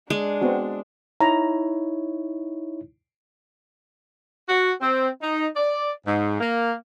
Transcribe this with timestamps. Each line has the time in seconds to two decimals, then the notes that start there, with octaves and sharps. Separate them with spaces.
0.10 G#3 D4
0.42 B3 C4 F#4
1.21 D#4 E4 C#5 A#5
4.49 F#4
4.81 C4
5.22 D#4
5.56 D5
6.06 G#2
6.40 A#3